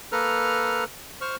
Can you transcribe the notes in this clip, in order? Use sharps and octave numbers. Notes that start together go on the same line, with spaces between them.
A#3 A4 B4 A#5 F6
C5 C#6 F6